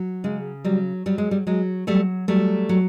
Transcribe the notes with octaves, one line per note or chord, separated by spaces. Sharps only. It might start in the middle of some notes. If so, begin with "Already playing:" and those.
Already playing: F#3
C#3 G#3
F#3 G3
F#3 G3
G#3
G3
F#3 G#3
F#3 G3 A3
F#3 G3 A3
F#3